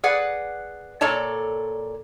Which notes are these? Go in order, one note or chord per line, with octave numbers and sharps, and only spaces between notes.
G#4 B4 D5 F#5
A#2 A4 C#5 D5 A5